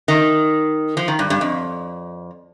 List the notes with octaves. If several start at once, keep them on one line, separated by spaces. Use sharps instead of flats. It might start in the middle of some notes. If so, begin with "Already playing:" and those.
D#3
F3
D#3
G2
G2
F2